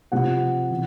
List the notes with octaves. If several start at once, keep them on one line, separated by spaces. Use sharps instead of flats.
C3 F3 F#5
E3